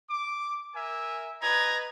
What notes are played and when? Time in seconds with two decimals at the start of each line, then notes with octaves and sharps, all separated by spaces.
0.10 D6
0.75 A#4 E5 G#5
1.43 B4 D#5 A#5 G#6